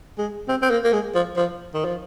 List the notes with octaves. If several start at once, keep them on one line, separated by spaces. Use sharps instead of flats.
G#3
C4
C4
A#3
A#3
G#3
F3
F3
D#3
F3